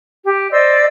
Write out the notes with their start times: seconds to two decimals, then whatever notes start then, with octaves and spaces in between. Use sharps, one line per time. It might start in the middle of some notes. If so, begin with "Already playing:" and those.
0.24 G4
0.51 C5 D5 D#5 E6